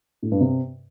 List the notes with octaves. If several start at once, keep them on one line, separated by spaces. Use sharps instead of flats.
A2
G2
C3